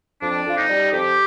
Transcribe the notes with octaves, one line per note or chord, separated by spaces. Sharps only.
F2 D4
F2 F4
D#4
G3
F2 G4